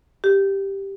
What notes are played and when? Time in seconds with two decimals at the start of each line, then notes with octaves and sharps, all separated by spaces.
0.24 G4